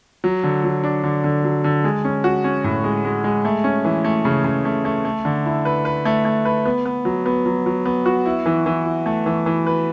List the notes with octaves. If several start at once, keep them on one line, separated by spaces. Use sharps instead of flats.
F#3
D3
F#3
D4
D3
D3
F#3
D3
G#3
C#4
F#4
C#4
A2
G#3
G#3
G#3
A3
C#4
E3
A3
C#3
C#3
A3
A3
A3
D3
E4
B4
B4
A3
A3
B4
B3
B3
F#3
B3
F#3
F#3
B3
F#4
E4
E3
E3
E4
A3
E3
E3
B4